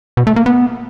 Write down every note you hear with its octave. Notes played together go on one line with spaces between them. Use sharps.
B2
A3
A#3
B3